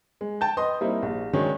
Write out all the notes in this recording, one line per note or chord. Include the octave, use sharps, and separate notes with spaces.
G#3
G5 A5 G6
B4 D#5 C6 D#6
G3 A#3 C4 D#4 E4
A#1
D#3 F#3 G#3 C#4 D4